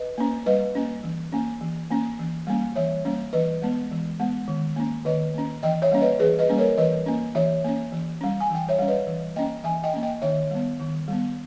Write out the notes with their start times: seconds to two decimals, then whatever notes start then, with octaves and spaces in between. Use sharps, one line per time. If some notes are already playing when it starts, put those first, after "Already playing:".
Already playing: B4 D#5
0.18 A#3 C#4
0.46 G3 B4 D#5
0.75 A#3 C#4
1.03 E3
1.33 A#3 C#4
1.61 E3
1.91 A#3 C#4
2.19 E3
2.47 G3 A#3 C#4
2.76 E3 C#5 E5
3.05 G3 A#3 C#4
3.33 E3 B4 D#5
3.62 G#3 B3
3.91 E3
4.20 G#3 B3
4.48 D#3
4.76 A#3 C#4
5.05 D#3 B4 D#5
5.34 A#3 C#4
5.63 E3 D#5 G5
5.82 C#5 E5
5.91 G3 A#3 C#4
6.01 B4 D#5
6.20 E3 G#4 B4
6.39 B4 D#5
6.49 G3 A#3 C#4
6.58 A#4 C#5
6.78 E3 B4 D#5
7.06 A#3 C#4
7.35 E3 C#5 E5
7.64 A#3 C#4
7.92 E3
8.21 G3 C#4
8.40 G#5
8.50 E3 G5
8.69 C#5 E5
8.79 G3 C#4
8.88 B4 D#5
9.07 E3
9.36 A#3 C#4 D#5 G5
9.64 E3 E5 G#5
9.84 D#5 G5
9.93 A#3 C#4
10.03 D#5 G5
10.22 D#3 C#5 E5
10.51 G3 B3
10.79 D#3
11.08 G3 B3